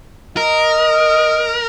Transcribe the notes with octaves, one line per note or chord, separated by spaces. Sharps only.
A#4 D#5